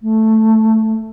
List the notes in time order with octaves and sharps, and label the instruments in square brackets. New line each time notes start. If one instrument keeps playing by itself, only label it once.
[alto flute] A3